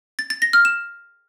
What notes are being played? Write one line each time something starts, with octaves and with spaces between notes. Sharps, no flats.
A6
A6
A#6
F6
E7